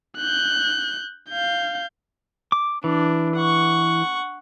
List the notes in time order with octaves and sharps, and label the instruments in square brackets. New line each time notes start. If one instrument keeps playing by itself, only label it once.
[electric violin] F#6 G6
F5 G6
[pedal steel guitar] D6
[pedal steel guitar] E3 [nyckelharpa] D4
[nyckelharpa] F#5 C#6